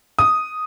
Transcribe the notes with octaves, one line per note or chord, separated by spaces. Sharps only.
D#6